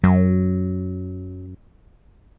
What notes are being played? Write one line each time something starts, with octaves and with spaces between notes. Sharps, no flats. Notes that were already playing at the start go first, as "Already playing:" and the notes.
F#2 F#3